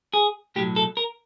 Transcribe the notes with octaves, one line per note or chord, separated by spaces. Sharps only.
G#4
B1 A2 F#3 G4
A4
A#4